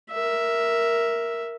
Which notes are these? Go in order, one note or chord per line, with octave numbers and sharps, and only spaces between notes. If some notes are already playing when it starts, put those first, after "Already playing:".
A#4 E5